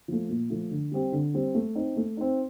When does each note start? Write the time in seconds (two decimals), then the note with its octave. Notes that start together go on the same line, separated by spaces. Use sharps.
0.08 F3 A3
0.29 A#2
0.50 F3 A3
0.71 D3
0.91 G3 C4 G4
1.12 D3
1.34 G3 C4 G4
1.55 A3
1.75 C4 D#4
1.96 A3
2.17 C4 D#4